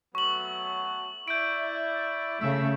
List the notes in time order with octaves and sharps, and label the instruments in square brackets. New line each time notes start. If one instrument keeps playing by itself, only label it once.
[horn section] F#3 A3 B3 [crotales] C#6 F#7
[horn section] E4 D5 [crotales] G6 D7
[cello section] C#3 A3 [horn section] E5